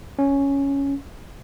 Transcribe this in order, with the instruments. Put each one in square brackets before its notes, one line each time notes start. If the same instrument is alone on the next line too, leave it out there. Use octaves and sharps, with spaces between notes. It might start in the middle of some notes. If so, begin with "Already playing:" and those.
[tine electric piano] C#4